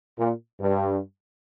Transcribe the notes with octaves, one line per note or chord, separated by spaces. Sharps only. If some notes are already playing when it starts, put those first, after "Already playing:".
A#2
G2